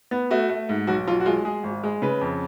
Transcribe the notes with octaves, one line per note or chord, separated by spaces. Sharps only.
B3
A3 F#4
A3
G#2
B1 F#4
B1 F4
F#4
G#3 F4
G#3 G#4
G#1
G#3
C#3 B4
F2